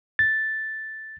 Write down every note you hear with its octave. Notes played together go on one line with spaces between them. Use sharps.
A6